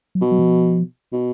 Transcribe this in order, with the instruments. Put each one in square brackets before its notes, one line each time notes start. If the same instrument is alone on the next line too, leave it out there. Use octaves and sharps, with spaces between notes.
[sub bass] F#3
[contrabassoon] B2
[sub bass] F#3
F3
[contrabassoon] B2